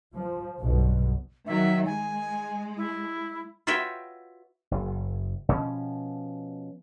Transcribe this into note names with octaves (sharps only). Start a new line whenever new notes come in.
F3
B1 G2 B2
D#3 F#3 E5
G#3 G#5
E4
F4 F#4 B4 C#5 E5 G5
F#1
B2 F3 C#4